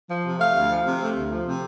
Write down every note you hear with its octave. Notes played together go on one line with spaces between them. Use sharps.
F3
C3
A3 F5
D2
F3
C3
A3
D2
F3
C3